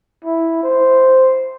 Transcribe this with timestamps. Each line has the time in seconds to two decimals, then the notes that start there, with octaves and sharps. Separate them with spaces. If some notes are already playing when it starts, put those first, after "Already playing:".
0.25 E4
0.63 C5